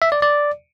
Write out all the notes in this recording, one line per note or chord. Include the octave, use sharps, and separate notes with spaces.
E5
D5
D5